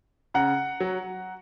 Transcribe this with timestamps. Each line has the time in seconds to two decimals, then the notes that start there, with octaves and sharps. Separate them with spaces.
0.34 C#3 F#5 A#5
0.80 F#3